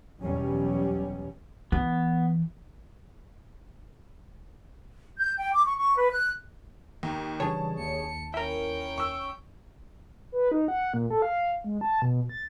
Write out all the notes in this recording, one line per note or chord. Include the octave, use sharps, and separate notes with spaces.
E2 B2 F#3 G3 C#4
E3 B3
G6
G5
D6
C#6
C#6
B4
F#6
D#2 G5 A#5
C#3 E3 G3 D4 G#4 C#5 A5
D#2 C#7
C#4 E4 A#4 G5
C#6 E6
B4
D#4
F#5
A#2
A4
F5
G#3
A5
B2
A6